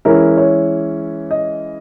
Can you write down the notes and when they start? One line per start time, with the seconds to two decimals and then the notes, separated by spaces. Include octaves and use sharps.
0.05 E3 G#3 C#4 E4 A#4
0.37 C#5
1.31 D#5